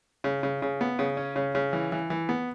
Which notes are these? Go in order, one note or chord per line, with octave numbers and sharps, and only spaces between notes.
C#3
C#3
C#3
B3
C#3
C#4
C#3
C#3
E3
E3
E3
B3